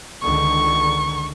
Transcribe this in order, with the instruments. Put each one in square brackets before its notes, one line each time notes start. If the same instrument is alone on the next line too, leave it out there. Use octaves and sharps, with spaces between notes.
[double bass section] C#2 D3 D#3 [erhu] C#6